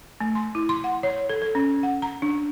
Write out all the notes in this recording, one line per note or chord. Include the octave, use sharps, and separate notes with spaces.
A3
C6
E4
C6
F#5
C#5
A4
A4
C#4
F#5
A#5
D4